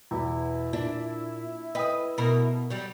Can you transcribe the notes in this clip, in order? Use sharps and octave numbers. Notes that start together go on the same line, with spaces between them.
E2 B2 E4
A#2 D4
B4 D#5 G5 D#6
B2 A#4 B5
F#3 G3